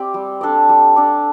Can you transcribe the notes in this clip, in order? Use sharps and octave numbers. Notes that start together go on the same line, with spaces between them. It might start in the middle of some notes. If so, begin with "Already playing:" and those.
Already playing: C4 G4 D5
G3
D4 A4 D5
G3
D4 A4 D5